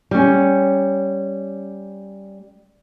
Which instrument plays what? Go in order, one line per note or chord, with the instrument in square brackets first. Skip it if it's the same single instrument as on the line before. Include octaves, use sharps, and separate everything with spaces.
[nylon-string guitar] G3 C#4